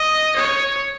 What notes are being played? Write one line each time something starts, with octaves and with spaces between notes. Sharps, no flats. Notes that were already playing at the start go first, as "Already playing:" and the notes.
Already playing: D#5
C#5